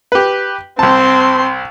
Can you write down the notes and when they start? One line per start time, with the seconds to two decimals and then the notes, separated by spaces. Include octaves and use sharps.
0.12 G4 B4
0.79 C2 C4 A5 C6